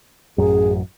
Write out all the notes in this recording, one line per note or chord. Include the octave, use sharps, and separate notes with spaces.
A1 F#2 G#4